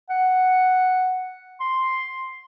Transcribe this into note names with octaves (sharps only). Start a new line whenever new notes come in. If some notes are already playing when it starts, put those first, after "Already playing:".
F#5
C6